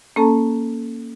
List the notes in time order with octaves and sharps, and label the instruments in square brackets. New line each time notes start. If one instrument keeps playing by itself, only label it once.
[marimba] A#3 C#4 A4 A5 A#5